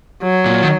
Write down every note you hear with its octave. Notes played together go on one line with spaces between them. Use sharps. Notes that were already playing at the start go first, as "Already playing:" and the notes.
F#3
A#2
D#3